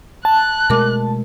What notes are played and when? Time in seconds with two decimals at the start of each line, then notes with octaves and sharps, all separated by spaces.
0.25 A5 F#6
0.70 B2 G#3 A3 A#4 D6